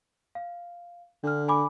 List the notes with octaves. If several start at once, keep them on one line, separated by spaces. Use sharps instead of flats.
F5
D3 D4 F6
G#5 B5 D6